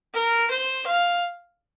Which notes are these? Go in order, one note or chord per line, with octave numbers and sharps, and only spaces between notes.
A#4
C5
F5